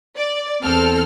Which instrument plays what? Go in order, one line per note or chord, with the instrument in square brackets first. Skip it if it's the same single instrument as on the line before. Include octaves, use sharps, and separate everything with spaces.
[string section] D5
E2 C4 A4 F6